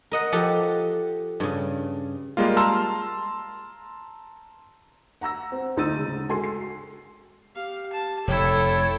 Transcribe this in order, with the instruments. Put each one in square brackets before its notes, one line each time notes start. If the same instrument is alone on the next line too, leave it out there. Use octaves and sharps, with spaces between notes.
[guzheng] A#4 D#5 F#5
F3 G4 A4 F#5
G2 C#3
[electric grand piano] G3 G#3 A#3 F4
A5 A#5 C6 E6 F6
[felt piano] F#5 A#5 E6 A#6
C4
D2 D#4 E6 A6 D#7
C#3 G#3
G#3 F#4 A4 G#5 C6 C7
C7
[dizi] G4 [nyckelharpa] F5
[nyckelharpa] A5
[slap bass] F1 [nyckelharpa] E4 G5 [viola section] A4 [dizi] C#5